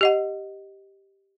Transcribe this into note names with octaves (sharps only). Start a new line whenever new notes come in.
G4 D#5 F#5